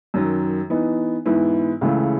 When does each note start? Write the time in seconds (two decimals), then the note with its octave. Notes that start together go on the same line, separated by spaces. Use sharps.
0.14 F#2 D#3 F#3
0.70 E3 B3 D#4
1.25 G#2 E3 B3 E4
1.81 C#2 C#3 E3 A3